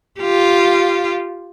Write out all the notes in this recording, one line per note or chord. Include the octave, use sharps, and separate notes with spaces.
F4 G4